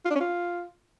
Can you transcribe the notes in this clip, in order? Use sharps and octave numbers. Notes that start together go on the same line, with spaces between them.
F4
D4
C#4
F4